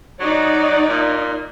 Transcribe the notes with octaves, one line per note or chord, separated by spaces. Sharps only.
F#3 D#4 D5
A#2